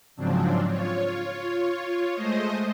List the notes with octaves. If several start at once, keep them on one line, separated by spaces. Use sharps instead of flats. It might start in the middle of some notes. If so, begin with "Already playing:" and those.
G#2 C#3 F3 F#3 C4 D4
F4 C#5
G#3 A3 C5 D#5